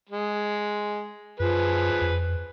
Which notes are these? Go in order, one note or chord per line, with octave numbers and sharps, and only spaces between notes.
G#3
F#2 F3 G#4 B4
F2